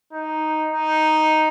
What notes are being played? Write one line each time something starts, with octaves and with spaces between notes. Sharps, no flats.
D#4
D#4